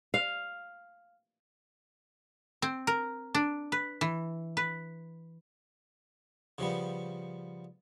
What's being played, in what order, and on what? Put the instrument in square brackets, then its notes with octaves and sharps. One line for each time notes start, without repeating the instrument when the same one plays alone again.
[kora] F5
[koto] C4
A#4
D4
B4
E3
B4
[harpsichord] C#3 F3 G3 B3